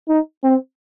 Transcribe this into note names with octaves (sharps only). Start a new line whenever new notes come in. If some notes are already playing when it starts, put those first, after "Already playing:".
D#4
C4